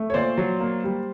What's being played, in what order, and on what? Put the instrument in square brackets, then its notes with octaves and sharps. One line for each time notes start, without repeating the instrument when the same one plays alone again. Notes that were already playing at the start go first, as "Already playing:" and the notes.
Already playing: [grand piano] A3
C#5
A#2 C5 D5
F#3
A#3
G3